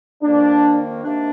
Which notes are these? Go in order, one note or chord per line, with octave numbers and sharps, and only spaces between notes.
F2 D#3 A#3 D4
C3 D#3 A#3 D4